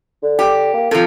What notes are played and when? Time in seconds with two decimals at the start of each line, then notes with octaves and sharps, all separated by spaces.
0.23 D3
0.39 G4
0.74 A#3
0.91 C3 F3 A4